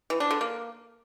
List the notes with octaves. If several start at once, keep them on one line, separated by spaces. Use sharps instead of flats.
E3
D4
D3
A#3